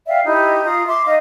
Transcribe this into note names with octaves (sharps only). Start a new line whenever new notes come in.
D5 E5 F5 G5
D#4 E4 G4
F4 A#5 D#6
E5 C6 D6
D#4 D#5 F5